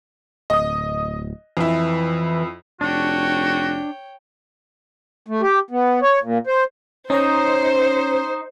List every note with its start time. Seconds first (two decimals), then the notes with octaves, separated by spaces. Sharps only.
0.50 D1 D#5 D#6
1.57 F2 E3 E4
2.81 F1 D4 F#4 C#5 G5
5.27 A3
5.41 G4
5.71 B3
6.02 C#5
6.23 A#2
6.47 C5
7.10 C#4 D#4 C5 C#5 A#5